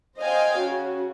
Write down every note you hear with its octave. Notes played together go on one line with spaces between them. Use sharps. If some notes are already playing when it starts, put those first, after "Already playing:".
C5 D#5 F5 G5 G#5
C#3 F#4